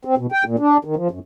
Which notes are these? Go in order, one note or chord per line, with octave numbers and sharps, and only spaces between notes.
C4
B2
G5
A#2
D4
D#3
F3
F#2